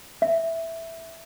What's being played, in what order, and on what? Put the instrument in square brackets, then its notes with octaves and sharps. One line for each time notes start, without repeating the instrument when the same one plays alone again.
[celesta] E5